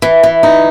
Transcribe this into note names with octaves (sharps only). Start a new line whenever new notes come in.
E3
E3
D#4